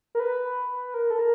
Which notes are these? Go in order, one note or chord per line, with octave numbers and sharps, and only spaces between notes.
A#4
B4
A#4
A4
A#4